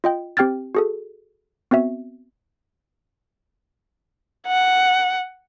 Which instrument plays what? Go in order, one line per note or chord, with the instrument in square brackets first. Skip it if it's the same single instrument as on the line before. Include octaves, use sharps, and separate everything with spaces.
[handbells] F4 D#5 G5
C4 G4 G5 F6 G#6 A6
F#4 G#4 A4
B3 C4 F#4 E5
[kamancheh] F#5